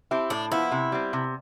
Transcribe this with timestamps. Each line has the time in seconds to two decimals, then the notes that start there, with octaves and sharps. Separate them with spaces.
0.11 C4 E4 G4
0.30 A2 D4
0.51 F3 B3 E4
0.72 C3
0.92 G3 C4
1.13 C3